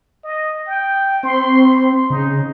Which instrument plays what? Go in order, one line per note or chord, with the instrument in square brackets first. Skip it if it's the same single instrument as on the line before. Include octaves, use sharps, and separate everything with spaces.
[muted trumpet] D#5
G5
[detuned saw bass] C4 [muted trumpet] C6
[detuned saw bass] C#3 [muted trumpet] D#4